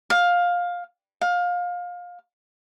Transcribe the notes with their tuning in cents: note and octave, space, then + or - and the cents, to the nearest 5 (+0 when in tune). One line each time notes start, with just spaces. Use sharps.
F5 +15
F5 +25